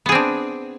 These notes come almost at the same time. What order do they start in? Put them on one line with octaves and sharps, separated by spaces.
B3 G#4 C4 D4